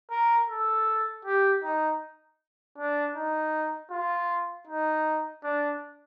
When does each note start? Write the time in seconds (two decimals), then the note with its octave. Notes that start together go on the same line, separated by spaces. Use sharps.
0.11 A#4
0.50 A4
1.25 G4
1.64 D#4
2.78 D4
3.15 D#4
3.91 F4
4.67 D#4
5.44 D4